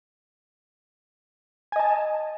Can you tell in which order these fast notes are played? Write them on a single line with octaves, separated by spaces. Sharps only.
G#5 D#5 A5